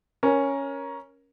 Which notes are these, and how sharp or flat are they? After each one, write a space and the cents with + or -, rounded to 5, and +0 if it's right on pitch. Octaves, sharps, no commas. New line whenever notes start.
C#4 +0 A#4 +15